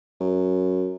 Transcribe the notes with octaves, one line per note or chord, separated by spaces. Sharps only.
F#2